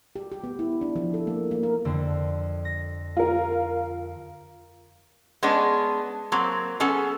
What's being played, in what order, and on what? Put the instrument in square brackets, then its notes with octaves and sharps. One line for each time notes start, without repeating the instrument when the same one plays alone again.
[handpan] G4
G4
B3
E4
D4
F3
A4
A#3
A#3
A#4
[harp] F2 D3
A#6
[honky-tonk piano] F4 A#4
[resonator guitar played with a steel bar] G#3 B3 C#4 D4
F#3 A#3 C4
B3 C#4 G#4 A4